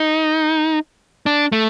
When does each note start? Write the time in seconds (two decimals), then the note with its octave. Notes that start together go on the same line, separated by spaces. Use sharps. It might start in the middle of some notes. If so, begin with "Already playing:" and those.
Already playing: D#4
1.26 D4
1.52 A3